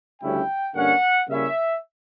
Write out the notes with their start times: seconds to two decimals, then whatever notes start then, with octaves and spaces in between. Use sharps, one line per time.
0.21 D2 C#3 G3 C#4 E4 G5
0.74 G2 D3 A#3 C#4 F#5
1.28 C#3 G3 A#3 C#4 E4 E5